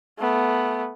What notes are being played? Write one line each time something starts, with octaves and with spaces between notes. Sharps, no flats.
A3 B3